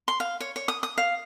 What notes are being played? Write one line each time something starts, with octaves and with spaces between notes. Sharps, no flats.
C6
F5
C#5
C#5
D#6
D#6
F5